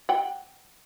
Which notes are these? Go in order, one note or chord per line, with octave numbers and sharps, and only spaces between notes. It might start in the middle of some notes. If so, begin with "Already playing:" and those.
F#5 G5